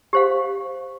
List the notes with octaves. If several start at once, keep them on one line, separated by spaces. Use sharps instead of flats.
G4 C5 F5